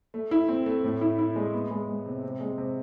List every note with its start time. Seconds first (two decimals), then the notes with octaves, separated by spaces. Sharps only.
0.14 A3
0.31 E4
0.49 C4
0.66 A3
0.84 A2
1.01 E4
1.19 E4
1.36 G#3
1.54 B3
1.71 G#3
1.89 G#3
2.06 C3
2.23 C3
2.41 G#3
2.58 C3